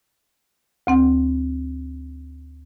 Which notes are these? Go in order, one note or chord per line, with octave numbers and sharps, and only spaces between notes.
D2 C4 F#5